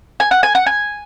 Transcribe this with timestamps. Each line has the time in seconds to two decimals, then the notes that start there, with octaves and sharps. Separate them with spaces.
0.20 G#5
0.31 F#5
0.43 G#5
0.55 F#5
0.66 G#5